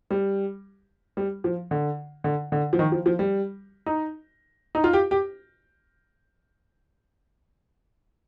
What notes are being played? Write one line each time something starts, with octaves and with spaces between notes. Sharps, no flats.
G3
G3
F3
D3
D3
D3
F3
D#3
F3
F3
G3
D#4
D#4
F4
G4
G4